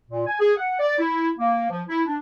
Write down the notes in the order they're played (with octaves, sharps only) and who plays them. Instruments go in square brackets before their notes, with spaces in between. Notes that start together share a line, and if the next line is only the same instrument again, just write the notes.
[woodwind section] A#2
G#5
G#4
F#5
D5
E4
A#3
F3
E4
D4